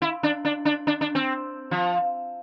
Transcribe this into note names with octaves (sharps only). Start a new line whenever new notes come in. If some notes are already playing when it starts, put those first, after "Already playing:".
E4
D4
D4
D4
D4
D4
C4
F3